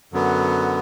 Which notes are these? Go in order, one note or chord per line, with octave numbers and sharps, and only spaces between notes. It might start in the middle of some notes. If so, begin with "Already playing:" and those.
F#2 D3 F#3 B3